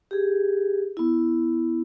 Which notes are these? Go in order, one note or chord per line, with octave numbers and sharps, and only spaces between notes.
G4 G#4
B3 E4